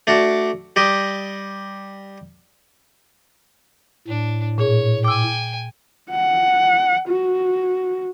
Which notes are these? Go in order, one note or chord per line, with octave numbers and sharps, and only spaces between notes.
A3 D4 F#4
G3 G4 D#5
A2 D4
A#2 G#4 C#5
G5 G#5 D6 E6
F#5
F#4